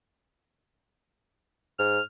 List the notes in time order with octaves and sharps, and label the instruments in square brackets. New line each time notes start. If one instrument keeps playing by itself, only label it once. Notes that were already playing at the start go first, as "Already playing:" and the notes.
[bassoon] G#2 [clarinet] F6